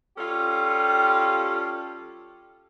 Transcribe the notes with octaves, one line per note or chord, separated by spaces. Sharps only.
G3 C#4 F4 G4 A4